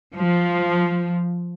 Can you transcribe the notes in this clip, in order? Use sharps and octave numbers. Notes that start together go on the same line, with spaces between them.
F3